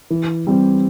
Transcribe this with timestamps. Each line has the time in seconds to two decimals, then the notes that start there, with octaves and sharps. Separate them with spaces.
0.10 E3
0.47 G3 C4 G4